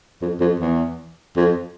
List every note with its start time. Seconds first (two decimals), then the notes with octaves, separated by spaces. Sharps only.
0.22 F2
0.40 F2
0.60 E2
1.37 F2